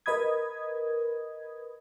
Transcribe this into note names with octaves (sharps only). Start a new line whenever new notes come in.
A#4 B4 D#5 B5 D#6 G#6